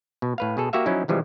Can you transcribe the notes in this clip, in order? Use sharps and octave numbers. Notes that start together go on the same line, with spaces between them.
B2
A2 B4 F5
B2 G#4 A4
A#3 F#4 G4 E5 F5
F3 F#3 C#4 D#4 E4
C3 E3 F3 G3 G#3